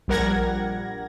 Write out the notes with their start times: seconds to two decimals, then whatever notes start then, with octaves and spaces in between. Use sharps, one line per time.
0.08 A#1 G3 A#4 F#5 G#6 A#6